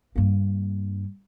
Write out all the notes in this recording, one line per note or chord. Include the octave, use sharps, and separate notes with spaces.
G2 A#3